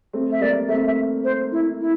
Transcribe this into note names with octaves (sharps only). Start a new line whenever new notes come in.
A3 C4
E5
G3 A#3 D5
A3 C4 E5
E5
C5
E4
E4